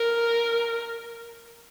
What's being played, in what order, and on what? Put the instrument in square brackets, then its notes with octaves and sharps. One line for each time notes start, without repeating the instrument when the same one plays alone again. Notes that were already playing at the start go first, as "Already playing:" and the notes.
Already playing: [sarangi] A#4